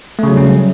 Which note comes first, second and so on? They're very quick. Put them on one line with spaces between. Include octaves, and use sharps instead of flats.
A3 C#3 F#3 G3 C#4